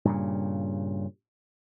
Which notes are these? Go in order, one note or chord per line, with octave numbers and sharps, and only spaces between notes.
G2 A#2 C#3